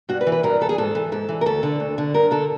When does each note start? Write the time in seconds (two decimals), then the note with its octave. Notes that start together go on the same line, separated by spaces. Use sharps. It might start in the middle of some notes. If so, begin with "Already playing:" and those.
0.09 G2 F#4
0.21 B4
0.27 E3
0.32 B4
0.43 G2 A#4
0.61 E3 A4
0.69 G#4
0.78 G#2 A4
0.95 E3
1.12 G#2 A4
1.29 E3
1.41 A#4
1.46 D2 A4
1.63 D3
1.80 D2
1.98 D3
2.14 G2 A#4
2.31 D3 A4